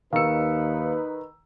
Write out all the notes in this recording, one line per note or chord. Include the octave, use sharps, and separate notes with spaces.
D#2 D#3 D#4 B4 F5 E6 C#7